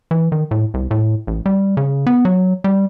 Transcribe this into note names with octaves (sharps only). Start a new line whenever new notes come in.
E3
D#3
A2
C2
A2
A1
G3
C#3
B3
F#3
G3